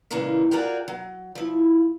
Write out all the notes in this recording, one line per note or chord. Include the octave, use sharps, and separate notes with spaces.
A#2 C#3 E3 G#3 A#3 D#4
F4 F#4 G#4 A#4 D5 G5
F#3
F3 E4